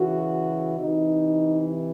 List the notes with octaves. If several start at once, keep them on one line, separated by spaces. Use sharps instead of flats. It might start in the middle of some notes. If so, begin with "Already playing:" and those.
Already playing: C#3 E3 F#4
C3 E3 D#4